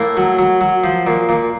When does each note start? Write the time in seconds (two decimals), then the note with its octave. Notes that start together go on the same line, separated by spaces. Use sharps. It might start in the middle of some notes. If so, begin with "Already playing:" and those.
Already playing: A2 A#3
0.17 F#3
0.39 F#3
0.61 F#3
0.84 F3
1.07 A#2
1.29 A#2